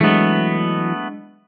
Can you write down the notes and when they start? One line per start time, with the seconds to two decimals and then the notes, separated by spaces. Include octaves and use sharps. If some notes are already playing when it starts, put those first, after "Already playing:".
0.01 E3 F#3 G#3 A3 B3 D4 D#5